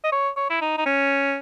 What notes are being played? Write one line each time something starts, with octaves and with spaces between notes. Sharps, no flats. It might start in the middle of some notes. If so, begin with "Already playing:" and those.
D#5
C#5
C#5
E4
D#4
D#4
C#4